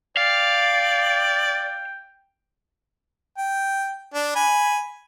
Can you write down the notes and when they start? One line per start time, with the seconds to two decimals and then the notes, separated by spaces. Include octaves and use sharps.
0.17 D5 F5 G5
3.38 G5
4.14 D4
4.36 G#5 B5